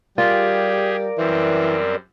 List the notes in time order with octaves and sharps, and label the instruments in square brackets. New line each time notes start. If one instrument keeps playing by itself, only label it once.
[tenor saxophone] G3 [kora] F4 [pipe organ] G4 G#4 [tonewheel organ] A#4 D5
[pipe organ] F#2 G3 C4 [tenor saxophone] E3